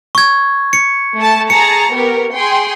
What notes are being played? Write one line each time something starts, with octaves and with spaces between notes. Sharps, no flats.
C#6 G#6
C#7
A3 A5
G#4 A5 A#5 C#7
B3 G4 A#4
G#4 G5 C6